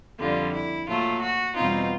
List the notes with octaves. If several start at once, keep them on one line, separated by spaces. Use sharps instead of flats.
F2 D3 G3 F4
E4
A#2 F#3 A3 F4
F#4
E2 B2 G3 C4 D#4 F4